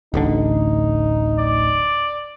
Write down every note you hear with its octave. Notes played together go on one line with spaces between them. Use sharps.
D1 A1 D3 D#4
D5